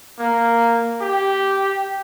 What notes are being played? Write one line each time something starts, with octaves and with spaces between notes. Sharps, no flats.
A#3
G4